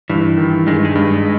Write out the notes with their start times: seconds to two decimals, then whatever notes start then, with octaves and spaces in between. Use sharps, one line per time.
0.10 G2 E3
0.38 D#3
0.67 G2 G#3
0.85 G#3
0.95 G2